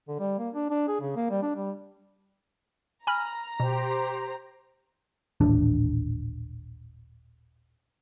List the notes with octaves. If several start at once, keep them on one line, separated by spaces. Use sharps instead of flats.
D3
G3
A#3
D4
D4
G#4
C#3
A#3
G3
D4
G3
G#5 A#5 B5 F6
B2 G4 C5
D#1 A1 D4